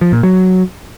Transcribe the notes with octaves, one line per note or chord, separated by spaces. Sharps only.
F3
A#2
F#3